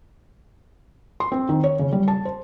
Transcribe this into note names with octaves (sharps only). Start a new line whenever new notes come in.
C6
C4
D#3
C#5
C#3
G3
A5
C5